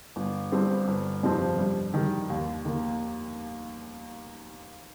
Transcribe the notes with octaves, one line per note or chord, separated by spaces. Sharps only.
G1
G2 G3 C4
G1
F2 C3 F3 C4
G2
D#3 G3
D#2
D#3 A#3